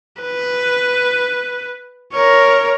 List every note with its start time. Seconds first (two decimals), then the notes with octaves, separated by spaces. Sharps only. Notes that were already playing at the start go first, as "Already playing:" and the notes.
0.22 B4
2.14 A#4 C#5